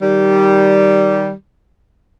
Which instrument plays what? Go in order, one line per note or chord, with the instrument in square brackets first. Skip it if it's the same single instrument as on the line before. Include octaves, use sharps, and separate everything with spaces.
[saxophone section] D#3 G3